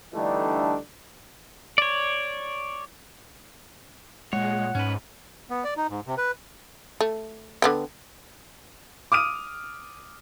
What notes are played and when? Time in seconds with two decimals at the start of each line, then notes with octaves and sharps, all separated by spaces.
0.14 D3 E3 G3 A3 D4 D#4
1.78 C#5 D5
4.33 A#2 G#3 C#5 F#5
4.75 G#2 C#4 B4
5.50 B3
5.64 D5
5.77 D#4
5.90 G#2
6.07 C3
6.18 B4
7.01 A3
7.62 D3 B3 G5
9.12 D6 D#6 F6 D#7